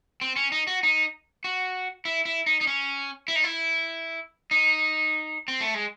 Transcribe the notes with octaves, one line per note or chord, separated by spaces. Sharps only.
C4
C#4
D#4
F#4
D#4
F#4
E4
E4
D#4
D#4
C#4
E4
D#4
E4
D#4
C4
A3
G#3